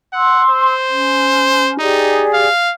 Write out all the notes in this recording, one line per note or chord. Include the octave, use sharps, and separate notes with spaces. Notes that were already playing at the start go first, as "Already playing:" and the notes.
F#5 C6 E6
C5
C#4
D#4 G4 G#4 D5
F5